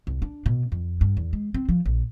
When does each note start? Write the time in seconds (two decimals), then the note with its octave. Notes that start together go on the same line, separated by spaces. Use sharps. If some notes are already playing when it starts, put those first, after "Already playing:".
0.07 C2
0.22 D4
0.46 B2
0.72 F2
1.01 G2
1.17 E2
1.33 G#3
1.54 C4
1.69 F3
1.86 A#1